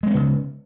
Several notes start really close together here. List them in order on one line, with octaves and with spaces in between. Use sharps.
G#3 C4 B3 C#3